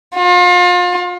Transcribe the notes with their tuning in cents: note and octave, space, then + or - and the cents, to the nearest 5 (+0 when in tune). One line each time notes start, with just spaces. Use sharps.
F4 +35